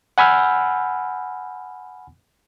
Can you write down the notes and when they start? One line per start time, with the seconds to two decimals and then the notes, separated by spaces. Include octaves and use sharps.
0.18 F#5 G#5 B5 E6 F6 G6